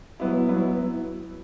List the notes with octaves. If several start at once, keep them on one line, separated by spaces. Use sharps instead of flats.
F#3 B3 E4
F#3 B3 E4